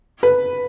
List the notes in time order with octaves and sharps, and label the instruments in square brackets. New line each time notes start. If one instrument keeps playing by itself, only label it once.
[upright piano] B4